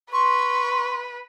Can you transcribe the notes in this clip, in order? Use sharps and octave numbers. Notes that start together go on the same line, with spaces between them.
B4 C6 C#6